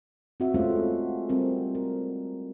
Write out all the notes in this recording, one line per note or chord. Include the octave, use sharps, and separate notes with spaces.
C4 F#4 E5
G#3 A3 C#4 F4 C5
G3 C4 A#4
A#4